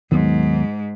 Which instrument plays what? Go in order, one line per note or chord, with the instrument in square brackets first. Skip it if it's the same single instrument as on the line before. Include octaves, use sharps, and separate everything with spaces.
[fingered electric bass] D#2 D#3 F#3 B3 [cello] G#2